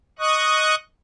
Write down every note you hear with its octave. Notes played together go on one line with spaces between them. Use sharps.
D#5 C#6 D#6 F#6